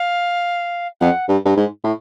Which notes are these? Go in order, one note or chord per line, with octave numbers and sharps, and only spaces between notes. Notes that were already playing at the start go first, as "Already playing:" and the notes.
Already playing: F5
F2 F#5
G2
G2
G#2
A2